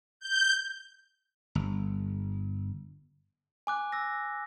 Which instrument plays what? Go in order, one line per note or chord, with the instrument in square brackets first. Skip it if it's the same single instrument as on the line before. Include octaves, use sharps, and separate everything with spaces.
[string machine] G6
[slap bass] G1
[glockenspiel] G#5 D6 F#6
E6 A#6